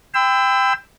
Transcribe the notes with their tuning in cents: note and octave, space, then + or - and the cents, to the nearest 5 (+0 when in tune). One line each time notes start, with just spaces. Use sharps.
G5 +15 B5 +45 E6 +0